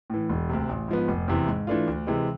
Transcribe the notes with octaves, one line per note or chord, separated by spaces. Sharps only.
A2 E3
E1
D2 C3
A1
G#2 F3 B3
F1
E2 C3 E3
G#2
E3 A3 D4 F4
D2
C3 E3 G#3